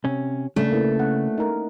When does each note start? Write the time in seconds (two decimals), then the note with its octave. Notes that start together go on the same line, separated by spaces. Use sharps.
0.05 C3 C#4
0.56 C#3 A3 D4
0.71 A#3 E4 B4
0.99 C#4 F#5
1.38 D#4 A#4